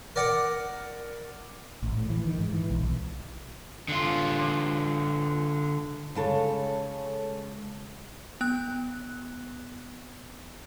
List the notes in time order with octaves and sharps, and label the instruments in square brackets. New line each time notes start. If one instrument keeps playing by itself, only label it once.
[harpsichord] A#4 D5 F#5
[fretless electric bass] A1
A2
E3
D#3
G#2
E3
B1
B1
[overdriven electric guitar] D3 F4
[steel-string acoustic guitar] C#3 G#3 A4 C#5
[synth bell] B3 F#6